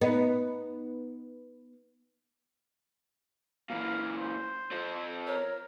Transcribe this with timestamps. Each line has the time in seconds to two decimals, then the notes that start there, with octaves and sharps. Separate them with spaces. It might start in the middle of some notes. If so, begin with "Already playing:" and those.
0.01 B3 D#4
3.70 A#2 E3 F5
4.17 C5
4.72 F3 C4
5.27 A#4 C#5